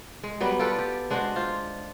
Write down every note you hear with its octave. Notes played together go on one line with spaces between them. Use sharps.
G#3
F#3 G3 B3 G4
F4 G4 A4 B4
G4
G#3 D4 F#4 C5
F4 C5